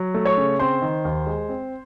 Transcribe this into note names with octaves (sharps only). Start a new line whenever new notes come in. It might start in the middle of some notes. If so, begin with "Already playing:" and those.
Already playing: F#3
A3
C#5 C#6
C#3
C4 C5 C6
D#3
D#2
G#3
C4